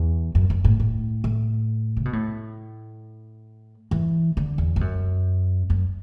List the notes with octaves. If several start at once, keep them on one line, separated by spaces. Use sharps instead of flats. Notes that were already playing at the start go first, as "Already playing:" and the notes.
Already playing: E2
F#2
F#2
A2
A2
A2
C#3
B2
A2
E3
D3
E2
G2
F#2
F#2